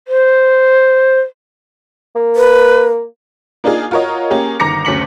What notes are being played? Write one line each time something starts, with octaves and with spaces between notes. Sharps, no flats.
C5
A#3
B4
A#3 D4 D#4 F4 G#4
F4 F#4 A#4 C#5 D#5
A#3 C#4 G4 G#4
G1 D#3 A#5 D6 A#6 C#7
F#1 D2 C#4 B6 C#7 F#7